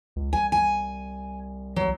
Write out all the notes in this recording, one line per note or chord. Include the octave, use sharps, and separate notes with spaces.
C#2
C2 G#5
G#5
F#3